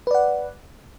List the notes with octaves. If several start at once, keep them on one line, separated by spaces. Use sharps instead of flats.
B4 D5 F#5